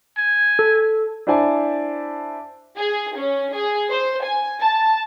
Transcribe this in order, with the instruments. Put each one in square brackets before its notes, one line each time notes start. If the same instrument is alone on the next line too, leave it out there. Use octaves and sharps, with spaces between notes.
[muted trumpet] G#5
[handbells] A4
[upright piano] D4 E4 C5 D5 G#5 A5
[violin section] G#4
C#4
G#4
C5
G#5
A5